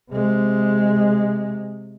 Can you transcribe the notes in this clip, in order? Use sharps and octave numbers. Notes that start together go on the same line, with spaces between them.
C3 G#3